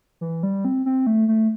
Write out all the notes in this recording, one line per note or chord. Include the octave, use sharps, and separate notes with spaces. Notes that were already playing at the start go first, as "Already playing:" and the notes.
E3
G3
C4
C4
A3
A3